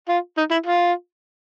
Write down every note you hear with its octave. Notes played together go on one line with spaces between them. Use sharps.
F4
D#4
E4
F4